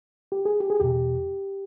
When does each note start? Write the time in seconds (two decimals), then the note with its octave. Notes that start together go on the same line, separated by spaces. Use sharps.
0.32 G4
0.45 G#4
0.60 G4
0.70 G#4
0.80 E2 B2 G4